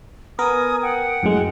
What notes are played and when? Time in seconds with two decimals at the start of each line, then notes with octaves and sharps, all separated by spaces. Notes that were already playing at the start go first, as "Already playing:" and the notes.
0.39 B3 A#4 G#5 D#6
0.82 F#5 G5
1.23 F#2 A2 G#3